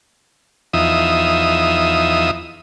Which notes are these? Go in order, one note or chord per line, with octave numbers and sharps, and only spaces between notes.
E2 F3 D#4 E5 D#6